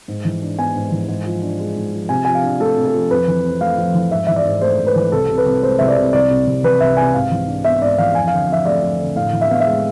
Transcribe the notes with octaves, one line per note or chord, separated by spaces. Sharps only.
G#2
E3
D4
B3 G#5
G#2
E3
G#2
F3
D4
G#3
G#2
F3
C3 G#5
F3 G#5
F5
D4
A3 A4
C3
A4
F3
F2 B4
E3
C4
A3 F5
F2
E3
G#2 E5
E3 E5
D5
G#2
A3 C5
G#2
B4
E3
C2 A4
C3
B4
C2
G#3 C5
C2 E5
D5
C3
C2 D5
C3
C2
E3 B4
C2 E5
C3 G#5
G#2 F5
E3
D4
B3 E5
G#2 D5
E3 F5
F2 G#5
D3 F5
F2 E5
A3 D5
F2
D3
A2 F5
E3
E5
B3 F5
E5
G#3